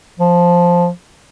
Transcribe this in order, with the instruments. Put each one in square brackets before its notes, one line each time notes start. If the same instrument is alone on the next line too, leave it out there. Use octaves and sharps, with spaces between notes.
[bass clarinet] F3